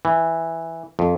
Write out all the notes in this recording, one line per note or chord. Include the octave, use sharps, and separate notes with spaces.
E3
F2